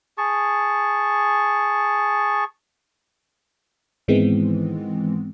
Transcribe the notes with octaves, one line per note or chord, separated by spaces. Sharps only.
G#4 A5 C#6
G#2 D#3 E3 G#3 B3 C4